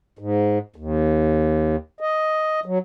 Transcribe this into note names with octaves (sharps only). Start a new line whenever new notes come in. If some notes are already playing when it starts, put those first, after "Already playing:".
G#2
D#2
D#5
F#3